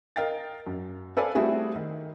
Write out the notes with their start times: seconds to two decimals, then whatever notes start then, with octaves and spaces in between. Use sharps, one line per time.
0.16 A#4 D#5 F5 G5 A6
0.67 F#2
1.17 A4 B4 D5 F5 G#5
1.35 G3 A3 C4 E4 F#4 G#4
1.76 D#3